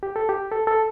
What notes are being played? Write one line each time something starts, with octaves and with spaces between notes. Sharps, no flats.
G4
A4
G4
A4
A4